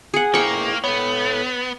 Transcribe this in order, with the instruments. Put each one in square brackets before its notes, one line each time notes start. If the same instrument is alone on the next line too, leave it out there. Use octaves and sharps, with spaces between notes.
[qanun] G#4 F#5
[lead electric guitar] A#3 [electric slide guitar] E4 G#4 C5 [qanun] G5 C#6
[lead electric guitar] B3 [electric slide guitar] A4 C#5